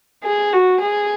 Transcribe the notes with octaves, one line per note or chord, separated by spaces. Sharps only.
G#4
F#4
G#4